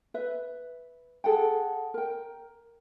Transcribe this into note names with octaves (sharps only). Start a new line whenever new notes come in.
B4 E5
G#4 A4 F#5 G5
A#4 G5